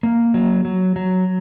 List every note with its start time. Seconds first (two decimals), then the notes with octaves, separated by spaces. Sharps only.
0.03 A#3
0.34 F#3
0.65 F#3
0.96 F#3